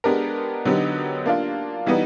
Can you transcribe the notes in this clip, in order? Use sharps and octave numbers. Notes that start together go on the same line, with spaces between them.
G#3 B3 D4 G4 A#4
D3 F#3 B3 D#4 G4
A#3 D4 F4
E3 G3 B3 D#4